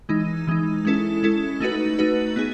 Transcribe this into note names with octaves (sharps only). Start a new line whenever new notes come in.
E3 G#3 D#4
E3 G#3 D#4
G#3 C#4 E4 A4
G#3 C#4 E4 A4
A3 D#4 F#4 B4
A3 D#4 F#4 B4
B3 D#4 G#4